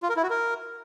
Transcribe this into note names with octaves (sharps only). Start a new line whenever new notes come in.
F4
A#4
E4
F#4
A#4